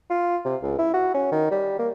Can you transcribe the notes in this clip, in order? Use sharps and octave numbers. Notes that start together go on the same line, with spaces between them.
F4
C3
C#2
E4
F#4
C#4
D#3
G3
A#3